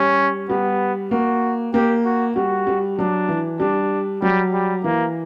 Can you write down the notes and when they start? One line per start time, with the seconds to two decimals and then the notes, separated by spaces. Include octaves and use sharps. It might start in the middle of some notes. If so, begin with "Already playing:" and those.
Already playing: G3 C#4
0.49 G3 B3
1.11 A#3 F#4
1.74 A#3 G4
2.05 F#4
2.36 G3 F#4
2.67 G3
2.98 F#3 D4
3.29 E3
3.60 G3 D4
4.22 F#3 G3
4.53 G3
4.84 E3 A#3